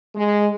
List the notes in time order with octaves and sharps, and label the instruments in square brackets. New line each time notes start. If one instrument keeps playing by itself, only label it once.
[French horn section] G#3